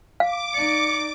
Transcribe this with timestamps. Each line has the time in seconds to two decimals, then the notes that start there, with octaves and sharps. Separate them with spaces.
0.20 F5 D6
0.54 D#4 D5 C#7